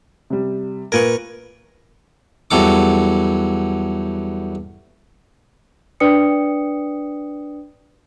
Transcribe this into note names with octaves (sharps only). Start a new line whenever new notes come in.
C3 G3
A#2 A#4 B4 C#6 G#6
E2 F#3 G3 A4 D6
D4 B4 D5 G5 D#6 C#7